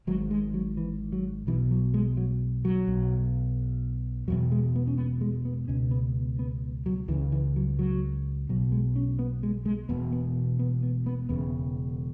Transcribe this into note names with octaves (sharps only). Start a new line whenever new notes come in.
G#1 G#2 F#3
G#3
F#3
E3
F#3
B1 B2 E3
F#3
G#3
F#3
F#3
B1 B2
E1 E2 B2 F#3
G#3
B3
C#4
B3
G#3
B3
C#2 B2 C#4
B3
B3
F#3
C#2 C#3 E3
E3
F#3
F#3
B1 B2 F#3
G#3
C#4
B3
G#3
G#3
E1 E2 B2 B3
B3
B3
B3
B3
E1 E2 C#3 B3